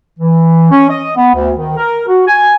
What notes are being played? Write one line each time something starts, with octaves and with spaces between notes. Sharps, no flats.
E3
C#4
D#5
B3
D2
D#3
A#4
F#4
G#5